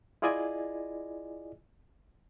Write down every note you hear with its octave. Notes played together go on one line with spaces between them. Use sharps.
E4 F4 G#4 D5 D#5 G#5